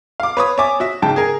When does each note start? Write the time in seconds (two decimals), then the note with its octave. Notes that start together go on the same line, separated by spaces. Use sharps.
0.20 F5 D6
0.37 B4 C#5 D#6
0.58 C#5 D5 E5 G#5 D6
0.80 F#4 E5
1.02 G#2 C#3 G5 A5
1.16 G#4 A#4 G#5